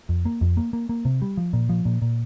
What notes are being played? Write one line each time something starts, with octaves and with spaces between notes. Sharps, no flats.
F2
A#3
F2
A#3
A#3
A#3
C3
G3
F3
A#2
F3
A#2
A#2